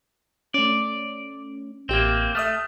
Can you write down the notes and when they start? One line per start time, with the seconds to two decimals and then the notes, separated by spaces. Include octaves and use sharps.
0.54 A3 C#4 D5
1.89 A1 A#3 C4 G4
2.35 A3 E5 D#6 F6